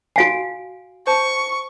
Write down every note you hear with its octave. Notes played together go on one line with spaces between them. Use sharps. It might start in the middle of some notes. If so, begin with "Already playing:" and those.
F#4 F5 G#5 C7 D7
C5 A5 C#6